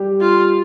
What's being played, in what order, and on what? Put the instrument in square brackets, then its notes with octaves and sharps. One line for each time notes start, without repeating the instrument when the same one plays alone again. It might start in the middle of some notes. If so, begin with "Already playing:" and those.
Already playing: [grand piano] G3 G4
[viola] F4